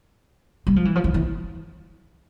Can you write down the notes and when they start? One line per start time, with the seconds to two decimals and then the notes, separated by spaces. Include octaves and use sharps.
0.67 G3
0.76 F3
0.85 E3
0.95 F3
1.04 E3
1.14 E3